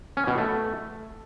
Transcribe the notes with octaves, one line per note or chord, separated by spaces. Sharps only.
C#4
B2
A3